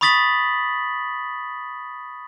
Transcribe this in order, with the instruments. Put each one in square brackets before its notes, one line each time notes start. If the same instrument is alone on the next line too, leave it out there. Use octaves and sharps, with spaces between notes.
[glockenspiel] B5 C#6 D#6 A6 B6 F#7